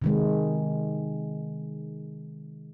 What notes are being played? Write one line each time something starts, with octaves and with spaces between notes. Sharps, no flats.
C3 D#3 G#3